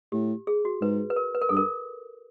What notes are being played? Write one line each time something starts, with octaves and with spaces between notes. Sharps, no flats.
A2 G4
G#4
F#4
G#2 B4
B4
A#4
B4
A#4
G2 A4
A#4